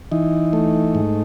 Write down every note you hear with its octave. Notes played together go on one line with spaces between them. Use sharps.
E3 D#4
A3
G#2